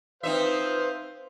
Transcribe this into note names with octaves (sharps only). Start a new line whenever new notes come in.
C4 D#4 B4 C5 E5 F5